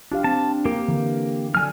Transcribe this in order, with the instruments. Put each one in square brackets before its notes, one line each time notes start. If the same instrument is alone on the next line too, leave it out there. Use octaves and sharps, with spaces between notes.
[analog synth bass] D4 [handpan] F4 G4 F5
[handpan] C4 [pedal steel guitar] A5
[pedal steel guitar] A#3 G4 [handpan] A#4
[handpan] D3 [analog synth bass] E3
[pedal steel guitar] D3 G#5 F6 [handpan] F#3